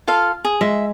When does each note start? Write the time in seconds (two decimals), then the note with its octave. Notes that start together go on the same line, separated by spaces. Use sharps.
0.08 F4 A4 F5
0.45 G#4
0.61 G#3 E5